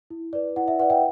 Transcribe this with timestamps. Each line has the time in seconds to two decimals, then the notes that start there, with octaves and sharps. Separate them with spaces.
0.10 E4
0.33 B4 D5
0.56 E4 F#5
0.68 E5
0.79 B4 D5 F#5
0.90 E5 G5